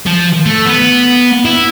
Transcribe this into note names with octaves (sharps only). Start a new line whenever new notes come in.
F3
A3
B3
E4